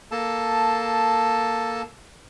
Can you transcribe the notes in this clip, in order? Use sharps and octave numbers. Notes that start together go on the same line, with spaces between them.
A#3 A4 A5